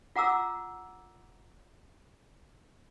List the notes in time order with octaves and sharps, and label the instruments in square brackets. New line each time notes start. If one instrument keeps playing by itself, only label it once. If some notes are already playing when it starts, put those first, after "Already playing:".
[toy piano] F4 F#5 A#5 D6 E6